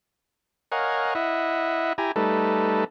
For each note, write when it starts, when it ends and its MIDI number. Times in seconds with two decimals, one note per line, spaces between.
0.72 1.14 70
0.72 1.14 73
0.72 1.14 75
0.72 1.14 77
0.72 1.14 78
0.72 1.14 80
1.15 1.93 64
1.15 1.93 75
1.15 1.93 76
1.15 1.93 78
1.98 2.12 64
1.98 2.12 67
1.98 2.12 80
1.98 2.12 82
2.16 2.84 55
2.16 2.84 57
2.16 2.84 63
2.16 2.84 69
2.16 2.84 71